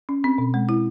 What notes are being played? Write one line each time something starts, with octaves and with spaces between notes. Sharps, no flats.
C#4
C4
B2
G#3
E4